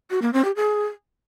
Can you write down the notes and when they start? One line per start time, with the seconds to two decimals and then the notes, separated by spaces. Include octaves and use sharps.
0.10 F#4
0.22 A#3
0.33 C4
0.44 G4
0.56 G#4